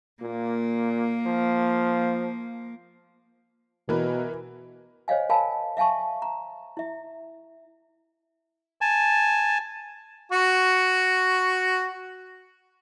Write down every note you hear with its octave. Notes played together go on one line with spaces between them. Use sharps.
A#2 A#3
F3
B2 E3 A#4 B4
C5 C#5 D#5 F5 G#5
A#4 F5 G#5 A5 B5
E5 F5 G#5 A5 C#6
A#5
E4 E5
G#5 A5
F#4 C#6